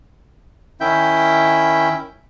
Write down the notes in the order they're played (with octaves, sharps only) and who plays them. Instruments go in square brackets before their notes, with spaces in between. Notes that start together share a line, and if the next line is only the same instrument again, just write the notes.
[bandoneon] D#3 C#4 E4 E5 G5 G6